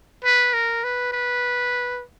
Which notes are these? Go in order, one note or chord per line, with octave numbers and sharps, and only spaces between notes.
B4
A#4
B4
B4